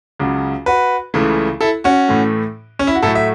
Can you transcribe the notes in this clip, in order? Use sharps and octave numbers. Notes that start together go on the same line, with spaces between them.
C#2 C#3 F#3
F#4 B4
C#2 C#3 E3 A3
E4 A4
C#4 F#4
A2 E3 A3
C#4
E4
F#4
A2 F#3 A3 E4 A4
E5